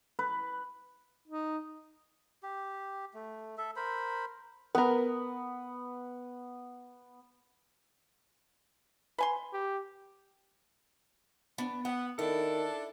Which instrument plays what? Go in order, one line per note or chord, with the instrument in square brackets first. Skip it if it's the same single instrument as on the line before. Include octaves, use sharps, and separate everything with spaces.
[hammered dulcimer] B4
[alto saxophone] D#4
[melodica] G4
A3
A4 E5
A#4 C5 B5
[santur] B3 [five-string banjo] A#4 B4
[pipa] B4 G#5 C6
[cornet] G4
[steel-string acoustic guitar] B3 D4
[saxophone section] B3 [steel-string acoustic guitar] F#5
[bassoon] D#3 [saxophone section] D4 A4 [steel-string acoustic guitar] E4